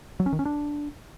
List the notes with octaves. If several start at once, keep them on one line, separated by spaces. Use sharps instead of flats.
F#3
C#4
D#3
C#4
D4